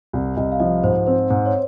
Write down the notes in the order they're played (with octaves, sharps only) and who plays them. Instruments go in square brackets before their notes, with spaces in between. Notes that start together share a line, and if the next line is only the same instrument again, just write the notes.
[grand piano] C2
[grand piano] C2 [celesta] D#5
[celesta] F5
[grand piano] F3 [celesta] D#5
[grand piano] G#2 [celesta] C5
[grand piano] C4 [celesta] C5
[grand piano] G#2
[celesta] C#5